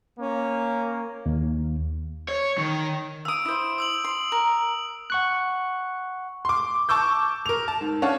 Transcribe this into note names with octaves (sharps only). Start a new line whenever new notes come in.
A#3 C#4
D#2
C#5
D#3
F5 D#6 E6 D7
E4 C5
D#6 E6 F#7
C6
A#4
F#5 C#6 F#6
C6 D6
A5 C#6 D6 E6 G6
A#4 F7
A5
G#2
C#4 D4 C#5 F5 F#5 A5